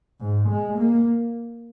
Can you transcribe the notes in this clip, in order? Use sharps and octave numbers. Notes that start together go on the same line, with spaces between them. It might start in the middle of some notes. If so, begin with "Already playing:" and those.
G#2
G#3
A#3